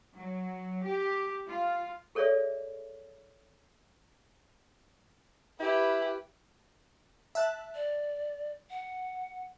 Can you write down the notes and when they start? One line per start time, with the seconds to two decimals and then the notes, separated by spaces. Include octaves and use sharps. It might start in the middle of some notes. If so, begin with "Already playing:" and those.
0.16 F#3
0.85 G4
1.48 F4
2.15 G#4 A4 C#5 D5 E5
5.60 E4 G4 B4
7.35 E5 A5 F#6
7.75 D5
8.70 F#5